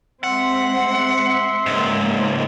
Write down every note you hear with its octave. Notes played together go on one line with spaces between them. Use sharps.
G#3 C4 E5 F#5 C6
C#2 G#2 G#3 A#3